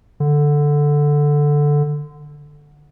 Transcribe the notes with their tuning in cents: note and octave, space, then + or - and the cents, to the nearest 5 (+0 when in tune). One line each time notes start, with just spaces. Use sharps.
D3 +0